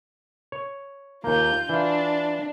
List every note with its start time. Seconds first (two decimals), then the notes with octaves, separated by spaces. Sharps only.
0.52 C#5
1.24 D#2 A#3 F4 G6
1.69 E3 D4 F4